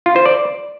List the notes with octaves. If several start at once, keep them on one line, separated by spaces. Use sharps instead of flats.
F4
C5
D5